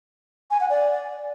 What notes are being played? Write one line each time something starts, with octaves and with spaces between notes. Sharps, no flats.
G#5
F#5
D5